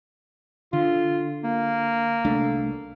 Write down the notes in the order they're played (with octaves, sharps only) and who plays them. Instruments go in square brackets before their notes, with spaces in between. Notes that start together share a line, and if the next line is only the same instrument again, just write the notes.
[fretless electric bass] D3 [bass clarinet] F4
[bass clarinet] A#3
[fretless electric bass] C2 A3 D4